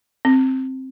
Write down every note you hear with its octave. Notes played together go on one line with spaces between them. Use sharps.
C4